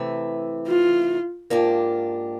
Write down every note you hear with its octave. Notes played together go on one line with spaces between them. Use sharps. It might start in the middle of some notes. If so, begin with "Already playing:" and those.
Already playing: C3 E3 A3
F4
G#2 F3 A#3 D4 G4